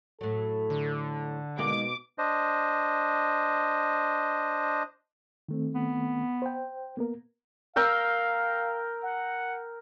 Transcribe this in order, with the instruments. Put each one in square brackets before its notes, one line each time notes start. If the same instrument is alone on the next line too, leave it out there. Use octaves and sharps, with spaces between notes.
[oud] A2 F#3 [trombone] A4
[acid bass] D3
[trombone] B2 [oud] G#3 A#3 D#4 [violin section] D6
[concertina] D4 C5 D#5
[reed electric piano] D#3 A3 C4
[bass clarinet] B3
[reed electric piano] C5 G5
A#3 B3 A#4
[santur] A#4 G5 E6 [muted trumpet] F5
[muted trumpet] F#5